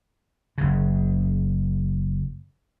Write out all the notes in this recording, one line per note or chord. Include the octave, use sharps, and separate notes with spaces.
F#1 C#3